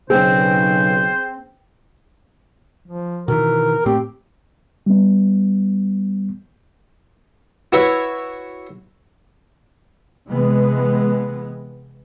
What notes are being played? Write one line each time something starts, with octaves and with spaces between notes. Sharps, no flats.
B1 C#3 C4 G#4 C5
F3
B2 D#3 E3 A#4
A2 A3 C4 G4
G3 B3
E4 F#4 B4 C#5 E5
C3 E3 G#3 B3